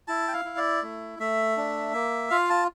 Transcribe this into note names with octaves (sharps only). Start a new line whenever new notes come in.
E4 A5
G5
F5
E4
D5
A3
A3 E5
D4
A#3
F4 F5
A5